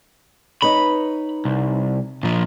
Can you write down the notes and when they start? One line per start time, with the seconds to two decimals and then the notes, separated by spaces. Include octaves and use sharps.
0.62 D#4 B4 C#5 B5
1.45 C2
2.23 A#2 F3